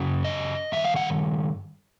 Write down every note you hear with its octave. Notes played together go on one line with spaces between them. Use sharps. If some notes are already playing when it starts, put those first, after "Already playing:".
Already playing: F#2 C#3 F#3
D#5
G2 D#3 E5
F5
F#5